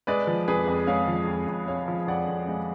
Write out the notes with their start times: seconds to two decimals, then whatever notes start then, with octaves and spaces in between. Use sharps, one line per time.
0.07 G#3 B4 D5
0.27 F3
0.48 F2 G#4 B4
0.67 F2
0.87 G#3 C#5 F5
1.08 F3
1.27 F2
1.47 F2
1.68 G#3 C#5 F5
1.88 F3
2.07 F2 D5 F#5
2.28 F2
2.48 G#3